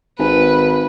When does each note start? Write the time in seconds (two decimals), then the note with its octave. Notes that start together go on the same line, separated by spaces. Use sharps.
0.19 G#1 B4